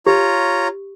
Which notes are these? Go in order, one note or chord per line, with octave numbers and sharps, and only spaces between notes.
F4 G4 C#5 A#5